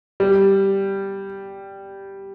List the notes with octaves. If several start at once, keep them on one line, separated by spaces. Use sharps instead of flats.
G3